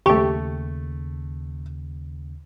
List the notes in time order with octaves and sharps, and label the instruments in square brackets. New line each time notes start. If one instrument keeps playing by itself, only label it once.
[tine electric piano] D#2 C#3 [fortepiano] A3 C#6 [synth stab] G4